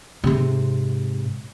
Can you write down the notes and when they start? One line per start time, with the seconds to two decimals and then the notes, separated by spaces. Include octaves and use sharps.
0.24 G#2 C3